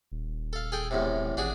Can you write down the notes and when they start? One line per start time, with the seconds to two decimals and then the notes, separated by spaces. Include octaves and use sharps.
0.12 D#1
0.53 A4 F5
0.72 G#4 A4 G5
0.91 E2 A2 C3
1.37 G#1 D4 F#4 G#4